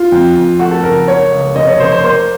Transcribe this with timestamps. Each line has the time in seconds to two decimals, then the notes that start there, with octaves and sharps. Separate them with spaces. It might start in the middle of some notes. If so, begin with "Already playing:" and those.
Already playing: F4
0.12 F2
0.36 F2
0.59 A3 F#4
0.71 A4
0.84 F#1 A#4
1.07 A#3 C#5
1.32 C#2
1.55 F1 D#5
1.68 C#5
1.79 F1 C5
1.92 C5
2.03 A#3 C5